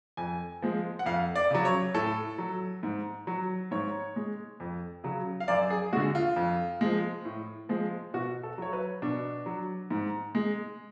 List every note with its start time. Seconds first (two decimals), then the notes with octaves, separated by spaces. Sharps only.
0.17 F2 G#5
0.62 F3 G#3
0.99 F#5
1.06 F2 F5
1.36 D5
1.51 C#3 F#3
1.65 C#5
1.94 A2 A4
2.38 F#3
2.83 G#2
3.27 F#3
3.71 G#2 C#5
4.16 G#3
4.60 F2
5.04 C#3 F#3
5.40 F5
5.48 F#2 D5
5.70 G#4
5.93 G#3 F#4
5.96 D3
6.15 F4
6.36 F2
6.81 F3 G#3
7.25 A2
7.69 F3 G#3
8.14 B2 F#4
8.43 A4
8.58 F#3 C#5
8.73 B4
9.02 B2 D4
9.46 F#3
9.91 G#2
10.35 G#3